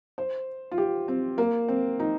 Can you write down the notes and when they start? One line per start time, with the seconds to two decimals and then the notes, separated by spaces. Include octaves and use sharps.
0.18 C5
0.71 F4
0.78 G4
1.08 C4
1.38 A#3
1.68 C4
1.99 D#4